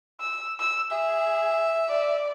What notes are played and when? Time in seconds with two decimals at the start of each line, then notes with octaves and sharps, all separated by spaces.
0.20 E6
0.59 E6
0.91 G#4 E5
1.88 D5